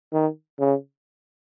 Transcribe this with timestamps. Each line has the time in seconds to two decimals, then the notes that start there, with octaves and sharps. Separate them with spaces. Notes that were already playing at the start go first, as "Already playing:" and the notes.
0.13 D#3
0.59 C#3